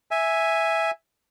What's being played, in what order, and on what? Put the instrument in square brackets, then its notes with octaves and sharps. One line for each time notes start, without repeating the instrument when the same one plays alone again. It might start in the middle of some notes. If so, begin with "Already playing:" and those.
[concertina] E5 G#5